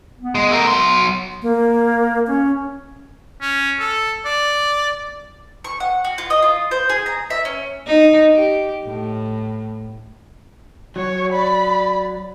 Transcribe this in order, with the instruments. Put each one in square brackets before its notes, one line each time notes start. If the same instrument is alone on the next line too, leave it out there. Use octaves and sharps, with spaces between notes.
[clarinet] B3
[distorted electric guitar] G#3
A3 A#4
F#3 C6
[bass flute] A#3
C#4
[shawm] C#4
A4
D5
[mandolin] C#6
F#5
F#4
F4
D#5
F4
C5
G#4
A#5
E5
C#4
[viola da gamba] D#4
G4
A2
[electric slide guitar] F#3 [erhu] C#5
[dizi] D5 [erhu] B5